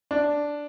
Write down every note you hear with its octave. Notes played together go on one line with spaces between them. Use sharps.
D4